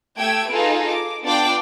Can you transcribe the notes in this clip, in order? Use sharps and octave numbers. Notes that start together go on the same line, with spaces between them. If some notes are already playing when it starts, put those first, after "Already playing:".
A3 G4 G5 E6 G#6 D7
D#4 F4 G#4 A4 B4
D6
B3 D4 F4 D5 G5 D6